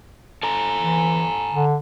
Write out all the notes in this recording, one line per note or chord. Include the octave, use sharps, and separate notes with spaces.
A4 G#5 A#5
E3
D3